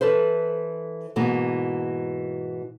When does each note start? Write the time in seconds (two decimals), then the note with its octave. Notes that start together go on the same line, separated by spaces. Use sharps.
0.01 E3 A4 B4 C5
1.16 G#2 B2 E3 A#3